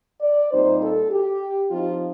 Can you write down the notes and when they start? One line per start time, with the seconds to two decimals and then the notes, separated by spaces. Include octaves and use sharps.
0.21 D5
0.51 A#2 G3 C4 D#4 C5
0.81 A4
1.10 G4
1.71 F3 C4 D#4 F4